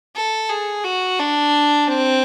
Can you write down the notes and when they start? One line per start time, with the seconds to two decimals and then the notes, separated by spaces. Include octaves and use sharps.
0.16 A4
0.50 G#4
0.84 F#4
1.19 D4
1.87 C4